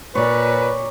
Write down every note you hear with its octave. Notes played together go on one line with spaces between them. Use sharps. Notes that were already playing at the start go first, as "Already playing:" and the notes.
A#2 B4 C#5 D5